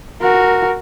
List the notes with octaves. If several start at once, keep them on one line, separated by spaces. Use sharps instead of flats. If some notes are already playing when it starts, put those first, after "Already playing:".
F#4 A#4